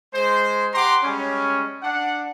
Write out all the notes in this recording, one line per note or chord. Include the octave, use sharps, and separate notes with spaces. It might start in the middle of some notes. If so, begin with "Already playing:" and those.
G#3 C5
G4 F#5 A#5 C6 D6
G3 G#3 C#4
D4 F#5